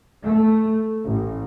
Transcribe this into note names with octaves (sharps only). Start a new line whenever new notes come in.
A3
A1